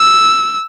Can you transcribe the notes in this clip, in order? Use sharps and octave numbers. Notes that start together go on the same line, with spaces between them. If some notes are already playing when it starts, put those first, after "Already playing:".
Already playing: E6